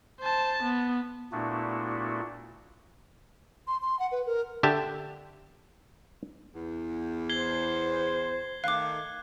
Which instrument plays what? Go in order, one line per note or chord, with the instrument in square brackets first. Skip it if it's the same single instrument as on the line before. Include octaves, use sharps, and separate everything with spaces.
[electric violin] C5 A5
B3
[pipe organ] A#2 A3 B3 D4 E4 F#4
[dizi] C6
C6
F#5
B4
A#4
[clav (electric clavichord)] D3 G4 E5 A5
[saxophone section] E2
[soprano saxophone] C5 [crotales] G#6 C7 G7
[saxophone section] D#3 A3 [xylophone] F5 D6 [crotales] F#6